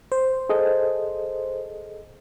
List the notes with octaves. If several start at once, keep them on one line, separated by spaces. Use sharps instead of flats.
C5
G#4 A4 D#5